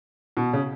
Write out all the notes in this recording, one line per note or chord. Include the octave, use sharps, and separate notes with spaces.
B2
C#3